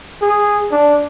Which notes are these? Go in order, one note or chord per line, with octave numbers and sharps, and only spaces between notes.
G#4
D4